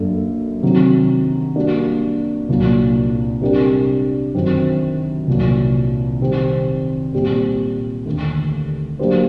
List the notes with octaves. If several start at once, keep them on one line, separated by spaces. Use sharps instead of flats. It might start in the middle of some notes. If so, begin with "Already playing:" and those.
Already playing: F#2 F#3 A#3 D4 A4
C3 D#3 F#3
G3 A#3 D4 F#4
C2 A#2 F#3 A#3
C3 G3 D4 G4 A#4
F#2 D#3 F#3 C4
C2 A#2 F#3
C3 D#3 G3 C4
A#2 G3 C4
D#2 D3 A3
F#3 A#3 D4 G4 C5